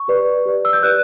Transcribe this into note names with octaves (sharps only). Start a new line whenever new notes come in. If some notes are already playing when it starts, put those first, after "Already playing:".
Already playing: C#6
G4 B4 D5
G4 B4 D5
E6
G6
G4 B4 D5 F#6